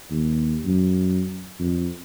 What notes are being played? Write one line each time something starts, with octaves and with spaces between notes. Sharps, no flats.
D#2
F#2
F2